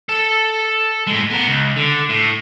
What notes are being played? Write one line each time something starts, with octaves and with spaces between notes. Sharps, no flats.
A4 A5
A2 G#3
B3 A#4
C#2
D3
A2